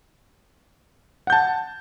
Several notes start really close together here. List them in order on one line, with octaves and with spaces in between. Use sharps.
F#5 G6 A5